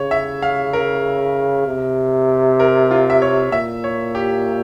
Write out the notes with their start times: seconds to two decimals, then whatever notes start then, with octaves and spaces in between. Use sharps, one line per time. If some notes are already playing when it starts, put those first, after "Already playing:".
Already playing: C#3 C#5
0.11 E5
0.42 F5
0.73 A#4
1.66 C3
2.60 A#4
2.91 F4
3.10 E5
3.22 C#5
3.52 A#2 E5
3.84 C#5
4.15 G4